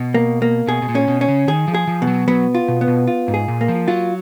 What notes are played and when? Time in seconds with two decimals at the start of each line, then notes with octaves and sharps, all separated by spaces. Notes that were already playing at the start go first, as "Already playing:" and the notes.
Already playing: B2
0.14 A#3
0.42 A#3
0.67 B2 G#4
0.82 B2
0.89 A#2
0.95 C#4
1.08 B2
1.21 C#4
1.28 C#3
1.48 D#3 G#4
1.68 F3
1.74 G#4
1.87 F3
2.02 B2
2.07 F#3
2.28 F#3 B3
2.55 F4
2.68 B2
2.81 B3
2.88 B2
3.07 F4
3.28 G#2
3.34 G#4
3.48 A#2
3.61 A#3
3.68 F3
3.88 F#3 F4